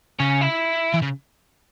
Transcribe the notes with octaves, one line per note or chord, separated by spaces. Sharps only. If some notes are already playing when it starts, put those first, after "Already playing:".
C#3 C#4
E4
E3
C#3